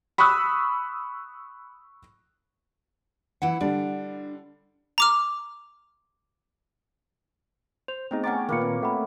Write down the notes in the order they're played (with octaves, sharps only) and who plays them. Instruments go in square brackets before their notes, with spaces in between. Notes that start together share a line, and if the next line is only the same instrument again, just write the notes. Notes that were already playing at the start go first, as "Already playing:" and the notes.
[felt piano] B5 C#6 D#6 E6 F#6
[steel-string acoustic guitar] E3 E4 F#5
[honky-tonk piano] D3 G3 [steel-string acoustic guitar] D4
[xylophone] A#5 D6 F6
[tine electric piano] C5 [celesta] F7
[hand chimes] A3 B3 G#4 [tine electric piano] C4 D#4
[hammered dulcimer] C#4 C#6 D6 [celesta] F#5 A#5 A6 [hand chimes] G5
[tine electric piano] A#2 D#3 [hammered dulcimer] A#3 B4 [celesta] A#4 F5 C#7
[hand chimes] C4
[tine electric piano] A3 [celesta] F#5 G5 B5